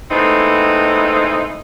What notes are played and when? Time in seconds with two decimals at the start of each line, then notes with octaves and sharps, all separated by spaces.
0.10 G#3 A3 B3 C4 D#4 E4